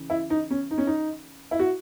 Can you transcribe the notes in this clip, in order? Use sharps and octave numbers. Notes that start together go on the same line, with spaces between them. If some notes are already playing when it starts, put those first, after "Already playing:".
Already playing: C#3 E3
E4
D#4
C#4
D#4
C#4
D#4
E4
F#4